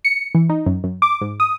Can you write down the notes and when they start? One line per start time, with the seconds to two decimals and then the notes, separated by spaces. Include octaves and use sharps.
0.05 C#7
0.35 E3
0.50 D#4
0.66 F#2
0.84 F#2
1.02 D6
1.21 G#2
1.40 D#6